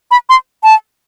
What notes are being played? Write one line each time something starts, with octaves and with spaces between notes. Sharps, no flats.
B5
C6
A5